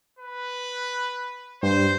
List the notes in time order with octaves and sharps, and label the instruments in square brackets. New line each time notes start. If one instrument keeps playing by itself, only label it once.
[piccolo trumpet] B4
[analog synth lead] G2 [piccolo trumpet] C5